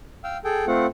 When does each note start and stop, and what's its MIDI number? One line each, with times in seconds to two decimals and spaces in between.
0.24 0.37 77
0.24 0.37 79
0.24 0.37 88
0.45 0.65 68
0.45 0.65 69
0.45 0.65 79
0.67 0.86 57
0.67 0.86 60
0.67 0.86 65
0.67 0.86 78